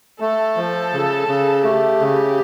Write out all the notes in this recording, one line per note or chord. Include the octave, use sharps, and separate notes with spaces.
A3 A4
F3
C#3
C#3
A3 G4
C#3